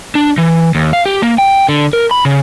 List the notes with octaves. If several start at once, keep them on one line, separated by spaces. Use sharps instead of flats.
D4
E3
D#2
F5
G4
A#3
G5
D3
A#4
B5
C#3